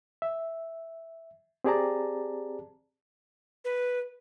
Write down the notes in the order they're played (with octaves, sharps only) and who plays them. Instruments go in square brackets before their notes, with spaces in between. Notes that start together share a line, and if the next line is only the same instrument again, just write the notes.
[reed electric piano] E5
C4 G4 G#4 D5 A5 A#5
[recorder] B4